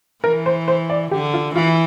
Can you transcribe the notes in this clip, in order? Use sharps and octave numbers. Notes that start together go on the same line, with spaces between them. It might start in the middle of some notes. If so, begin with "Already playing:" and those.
E3 A#4
C5
C5
D5
D3 G4
F4
E3 F4